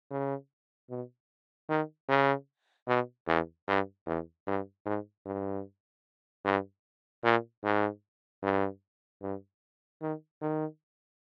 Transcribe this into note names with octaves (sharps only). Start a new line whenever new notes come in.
C#3
B2
D#3
C#3
B2
E2
G2
E2
G2
G#2
G2
G2
A#2
G#2
G2
G2
D#3
D#3